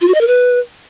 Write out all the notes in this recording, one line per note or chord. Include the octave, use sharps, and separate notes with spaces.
F4
F#4
D#5
A#4
B4